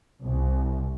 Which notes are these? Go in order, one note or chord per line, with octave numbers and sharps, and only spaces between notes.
C2